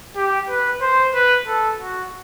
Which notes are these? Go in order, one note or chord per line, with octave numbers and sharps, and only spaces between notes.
G4
B4
C5
B4
A4
F#4